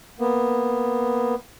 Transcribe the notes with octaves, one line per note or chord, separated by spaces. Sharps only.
A#3 B3